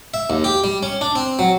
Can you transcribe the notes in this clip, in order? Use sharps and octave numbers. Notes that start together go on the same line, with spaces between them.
E5
D#2
G4
G3
C#4
D4
C4
F#3